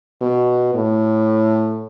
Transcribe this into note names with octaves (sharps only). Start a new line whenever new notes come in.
B2
A2